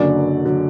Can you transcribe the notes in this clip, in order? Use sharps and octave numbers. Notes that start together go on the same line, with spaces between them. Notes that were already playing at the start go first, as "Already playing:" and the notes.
Already playing: F#1 F#2 D3 F#3 D5
D3 F#3